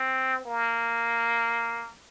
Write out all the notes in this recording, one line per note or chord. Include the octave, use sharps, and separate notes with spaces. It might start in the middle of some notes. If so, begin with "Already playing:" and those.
Already playing: C4
A#3